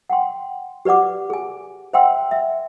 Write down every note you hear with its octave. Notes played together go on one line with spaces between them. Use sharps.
F#5 G5 C6
G4 B4 D5 F#5 D6
G#4 G#5
C5 E5 F#5 G5 C6 E6
E5